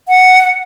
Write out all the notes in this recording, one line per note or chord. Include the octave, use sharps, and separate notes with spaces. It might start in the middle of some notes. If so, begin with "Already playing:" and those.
F#5